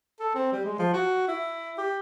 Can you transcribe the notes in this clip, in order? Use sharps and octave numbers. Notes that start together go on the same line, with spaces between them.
A4
C4
G3
G#3
F3
F#4
E4
G4